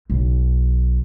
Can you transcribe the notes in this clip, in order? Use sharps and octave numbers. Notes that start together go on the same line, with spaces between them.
B1